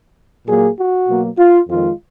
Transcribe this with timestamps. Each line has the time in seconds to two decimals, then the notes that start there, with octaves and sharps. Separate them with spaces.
0.47 A#2 F#3 A#3 G#4
0.78 F#4
1.08 B2 F#3 A#3
1.38 F4
1.69 F2 D#3 G#3 F4